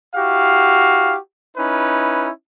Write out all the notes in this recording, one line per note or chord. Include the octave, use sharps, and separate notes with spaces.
E4 F#4 G4 F5
C#4 D#4 E4 B4